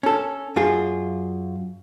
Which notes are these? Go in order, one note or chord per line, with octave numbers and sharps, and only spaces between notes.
C#4 A4
F#2 F4 G#4